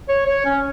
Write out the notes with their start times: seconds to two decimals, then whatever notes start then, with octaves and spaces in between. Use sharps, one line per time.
0.09 C#5
0.27 C#5
0.45 C#4